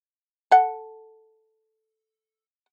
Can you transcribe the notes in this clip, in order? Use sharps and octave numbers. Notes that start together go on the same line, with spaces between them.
A4 F#5